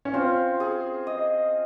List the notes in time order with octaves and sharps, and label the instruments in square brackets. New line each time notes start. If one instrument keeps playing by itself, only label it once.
[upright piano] C#4
[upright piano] C4 [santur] F4
[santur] G#4
D#5